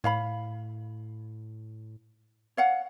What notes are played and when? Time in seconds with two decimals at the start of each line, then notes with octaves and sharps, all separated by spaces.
0.04 A2 C#5 F5 B5
2.57 C#5 F5 F#5